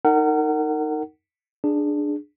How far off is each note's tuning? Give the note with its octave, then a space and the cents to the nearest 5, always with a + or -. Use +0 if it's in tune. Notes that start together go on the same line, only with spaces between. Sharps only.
D#4 +0 A#4 -30 F#5 +20
D4 +10 G#4 +0